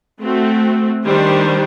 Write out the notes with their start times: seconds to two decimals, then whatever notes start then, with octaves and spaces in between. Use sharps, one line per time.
0.21 A3 C4 F#4
1.04 D#3 G3 D4 G4 C5